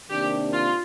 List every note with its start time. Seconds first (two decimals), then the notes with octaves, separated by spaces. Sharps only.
0.10 C3 D#3 A#3 D4 G4
0.54 F4